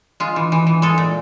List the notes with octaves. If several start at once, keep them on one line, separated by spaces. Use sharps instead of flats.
G#3 F4
E3
E3
E3
G#3 A4
A#2